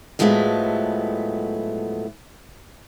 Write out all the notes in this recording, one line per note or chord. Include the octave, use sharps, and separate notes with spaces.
A2 F3 F#3 G#3 A3 B3